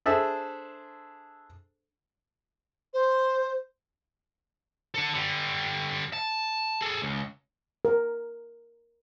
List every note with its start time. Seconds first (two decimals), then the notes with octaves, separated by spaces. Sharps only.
0.06 D4 G#4 A4 C5 E5
2.94 C5
4.94 D3 A4
5.14 D3 G3
6.13 A5
6.81 G#4 A4
7.02 C#2
7.85 A#4